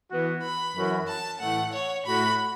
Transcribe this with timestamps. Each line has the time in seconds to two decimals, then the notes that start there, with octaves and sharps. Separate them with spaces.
0.10 E3 B3 F#4
0.43 B5
0.75 F#2 E3 C#4 F#4
1.08 A5
1.40 A2 E3 A3 F#5
1.73 C#5
2.05 A2 A3 F#4 B5